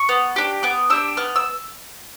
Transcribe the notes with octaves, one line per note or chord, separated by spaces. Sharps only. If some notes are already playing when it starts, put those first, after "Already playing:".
Already playing: C#6
B3
D4 G4
B3 D6
D4 G4 E6
B3 F6
E6